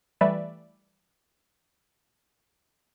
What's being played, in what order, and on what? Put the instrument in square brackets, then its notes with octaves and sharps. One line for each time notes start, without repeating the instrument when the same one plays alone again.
[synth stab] E3 G3 A3 B4 D5 E5